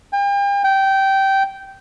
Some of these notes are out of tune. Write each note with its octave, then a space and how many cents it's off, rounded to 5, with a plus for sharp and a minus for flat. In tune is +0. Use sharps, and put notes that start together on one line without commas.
G5 +40
G5 -15